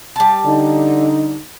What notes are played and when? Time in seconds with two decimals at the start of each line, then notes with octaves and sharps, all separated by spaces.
0.16 G3 A5
0.46 D3 D#4